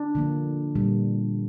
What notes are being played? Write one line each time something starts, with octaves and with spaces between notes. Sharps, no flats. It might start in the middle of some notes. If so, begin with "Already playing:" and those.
Already playing: D4
D3 F3 A#3
A#2 G3 A#3